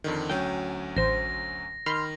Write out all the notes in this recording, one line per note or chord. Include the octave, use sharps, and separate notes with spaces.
F2 D3 D#3
D2 F#3 C#4 G5
A1 C5 A#6
D#3 B5 C6 F6